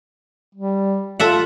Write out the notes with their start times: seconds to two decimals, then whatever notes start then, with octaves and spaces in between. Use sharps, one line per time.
0.55 G3
1.20 F4 A4 E5 F#5